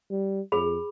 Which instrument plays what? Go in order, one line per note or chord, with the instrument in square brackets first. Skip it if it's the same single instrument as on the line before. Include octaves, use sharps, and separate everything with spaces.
[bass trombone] G3
[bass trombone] F2 [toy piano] G#4 B5